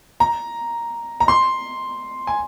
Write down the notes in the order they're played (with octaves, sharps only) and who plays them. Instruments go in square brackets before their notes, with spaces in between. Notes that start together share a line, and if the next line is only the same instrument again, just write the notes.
[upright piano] A#5
A#5
C6
G#5